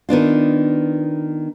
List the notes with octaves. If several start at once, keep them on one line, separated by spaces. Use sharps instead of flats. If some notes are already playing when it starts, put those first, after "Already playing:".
D#3 B3 D4 F4